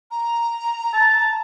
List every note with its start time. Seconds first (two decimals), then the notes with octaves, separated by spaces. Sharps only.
0.11 A#5
0.93 A5